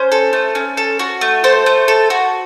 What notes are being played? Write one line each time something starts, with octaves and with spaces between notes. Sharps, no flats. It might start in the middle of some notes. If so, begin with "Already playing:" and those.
Already playing: C#4 C5
A4
A3
C#4
A4
F#4
A3
A4 C5
A3
A4
F#4